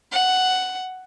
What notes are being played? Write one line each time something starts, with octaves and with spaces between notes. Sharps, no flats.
F#5